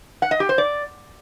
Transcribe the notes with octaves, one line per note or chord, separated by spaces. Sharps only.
F#5
D#5
G4
C5
D5